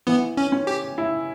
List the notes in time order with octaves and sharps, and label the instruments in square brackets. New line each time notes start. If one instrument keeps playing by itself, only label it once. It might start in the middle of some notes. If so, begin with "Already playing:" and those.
[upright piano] E3 [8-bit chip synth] B3
[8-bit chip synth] C#4
[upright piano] C#4
[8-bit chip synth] G4
[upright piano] E4